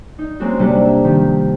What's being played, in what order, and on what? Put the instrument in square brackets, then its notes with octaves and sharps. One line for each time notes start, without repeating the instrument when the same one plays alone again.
[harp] D#4
G#3 A#3 C4 C#4 F#4
C3 G3 A#3 C4 D4 A4
E5
C3 D#3 F3 G4